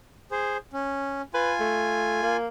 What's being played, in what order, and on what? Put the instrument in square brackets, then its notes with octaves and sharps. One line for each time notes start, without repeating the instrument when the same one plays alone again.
[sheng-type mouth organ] G#4 C5
C#4
[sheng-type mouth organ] F4 G#5 [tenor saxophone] B4
[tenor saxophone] A3
A#3